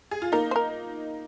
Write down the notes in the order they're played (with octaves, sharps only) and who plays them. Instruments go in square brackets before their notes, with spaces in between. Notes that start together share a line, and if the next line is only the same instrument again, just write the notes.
[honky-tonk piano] G#4
F4
[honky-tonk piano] A#3 D#4 [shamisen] A#4
[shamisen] C5
A#4